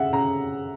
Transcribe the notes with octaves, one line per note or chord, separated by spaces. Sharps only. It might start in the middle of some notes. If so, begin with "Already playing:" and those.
Already playing: C#3 E5 F#5
C#3 A#5